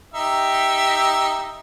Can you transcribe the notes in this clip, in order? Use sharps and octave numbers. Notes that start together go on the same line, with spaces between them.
D#4 G4 E5